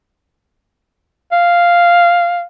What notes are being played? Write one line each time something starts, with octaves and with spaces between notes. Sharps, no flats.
F5